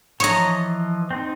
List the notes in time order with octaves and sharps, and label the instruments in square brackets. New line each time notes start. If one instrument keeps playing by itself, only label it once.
[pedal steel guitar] E3 F3 D#5 [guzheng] C#5 A#5
[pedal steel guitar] C4 D#4